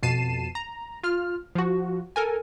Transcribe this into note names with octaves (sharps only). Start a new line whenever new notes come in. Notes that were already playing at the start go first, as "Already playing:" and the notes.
F2 B2 A5 C7 D#7 E7
A#5
F4 F6
F3 F#4
A4 A#4 G#5